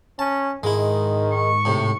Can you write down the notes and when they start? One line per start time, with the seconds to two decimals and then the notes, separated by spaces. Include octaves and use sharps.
0.19 C#4 A5
0.63 G#2 D#3 G#3 E4
1.34 C#6
1.65 A2 C3